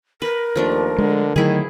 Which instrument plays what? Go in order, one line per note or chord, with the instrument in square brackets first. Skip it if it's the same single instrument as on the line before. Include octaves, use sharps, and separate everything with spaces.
[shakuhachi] A#4 [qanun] B4
[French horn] D#2 [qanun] F3 A3 D4
[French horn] D3 [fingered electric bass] G#3
[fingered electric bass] D3 F#3 A3 [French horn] D#3 [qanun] E4 G#4